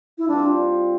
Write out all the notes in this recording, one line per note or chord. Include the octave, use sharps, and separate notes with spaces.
E4
G3 C4 D4 F4